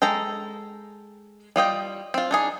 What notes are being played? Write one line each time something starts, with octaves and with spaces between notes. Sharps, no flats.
G#3 A4 G5 A#5
G3 F4 D#5 G5
C4 F4
D4 D#4 G#4